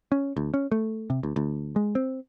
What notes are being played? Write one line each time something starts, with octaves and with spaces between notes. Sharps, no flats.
C#4
D2
C#4
A3
C3
D2
D2
G#3
C4